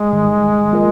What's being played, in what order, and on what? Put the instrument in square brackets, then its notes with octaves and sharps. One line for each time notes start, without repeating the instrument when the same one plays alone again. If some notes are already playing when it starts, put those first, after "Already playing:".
Already playing: [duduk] G#3
[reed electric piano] G#2 D#3 G3
F3 A#3 F4 A#4 D#5